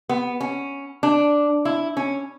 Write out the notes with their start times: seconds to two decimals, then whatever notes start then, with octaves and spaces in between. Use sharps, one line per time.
0.09 B3
0.41 C#4
1.03 D4
1.65 E4
1.97 C#4